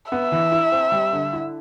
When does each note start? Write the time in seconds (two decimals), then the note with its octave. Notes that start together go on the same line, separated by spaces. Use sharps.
0.12 B3 E5
0.32 E3
0.52 E4
0.72 C4
0.92 G3
1.13 D3
1.33 E4